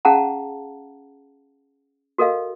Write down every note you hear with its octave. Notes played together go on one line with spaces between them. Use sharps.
C#4 G#4 F5 F#5 A5 A#5
F#4 A4 A#4 D#5 F5